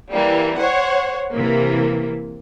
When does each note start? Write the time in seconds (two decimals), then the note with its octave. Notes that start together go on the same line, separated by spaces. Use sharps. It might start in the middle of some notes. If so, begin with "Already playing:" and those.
0.12 E3 G3 A#3
0.58 C5 C#5 F#5
1.35 C3 E3 A#3